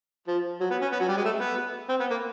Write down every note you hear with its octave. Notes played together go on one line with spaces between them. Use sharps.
F3
F#3
B3
C#4
B3
F#3
G3
G#3
A3
B3
C4
B3
A#3